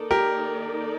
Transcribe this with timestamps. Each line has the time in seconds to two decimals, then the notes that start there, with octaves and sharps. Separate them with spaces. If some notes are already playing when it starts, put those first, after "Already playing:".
Already playing: D#3 A#3 D#4 A4 D5
0.11 G4 A#4